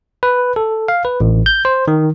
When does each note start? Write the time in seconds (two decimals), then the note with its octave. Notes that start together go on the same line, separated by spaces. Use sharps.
0.23 B4
0.56 A4
0.88 F5
1.05 B4
1.20 A1
1.46 G6
1.65 C5
1.88 D#3